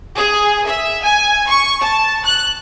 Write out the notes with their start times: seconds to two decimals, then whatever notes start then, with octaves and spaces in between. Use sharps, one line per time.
0.16 G#4
0.65 E5
1.03 G#5
1.47 C#6
1.82 A5
2.24 F#6